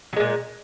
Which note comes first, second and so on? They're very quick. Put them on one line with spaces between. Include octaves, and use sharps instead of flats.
F#3 G#3 A#2